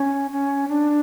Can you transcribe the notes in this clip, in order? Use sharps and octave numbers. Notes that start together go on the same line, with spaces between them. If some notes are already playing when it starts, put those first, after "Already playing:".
Already playing: C#4
C#4
D4